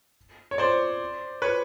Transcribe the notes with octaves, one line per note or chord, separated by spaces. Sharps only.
C#5
C5 D5
B4 C#5